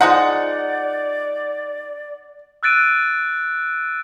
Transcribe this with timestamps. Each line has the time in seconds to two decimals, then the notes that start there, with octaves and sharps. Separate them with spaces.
0.01 F3 G#3 D#4 D5 F#5
2.63 E6 F#6 A6 D7 D#7